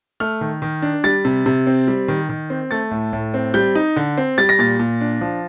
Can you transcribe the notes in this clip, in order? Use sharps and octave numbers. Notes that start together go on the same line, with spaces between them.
A3 F6
D#3
D#3
D4
G3 A6
C3
C3
C4
G3
D#3
D#3
C4
A3 A6
A2
A2
C4
G3 G6
D#4
D3
C4
G3 A6
A#6
A#2 A6
A#2
D4
F3